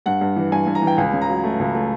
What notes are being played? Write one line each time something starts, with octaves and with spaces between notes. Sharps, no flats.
G2 F#5
G2
E3
G2 G#5
G2
A#5
E3
G5
C#2 G#5
C#3
A#5
F#3
A3
C#2
A3